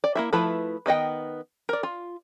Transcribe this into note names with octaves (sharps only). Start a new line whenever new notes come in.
D5
A#3 E4 E5
F3 A3 E4 B4 B5
D#3 B3 D#5 G5
A#4 D5
F4